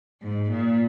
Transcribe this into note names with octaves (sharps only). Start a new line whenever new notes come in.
G#2
A#2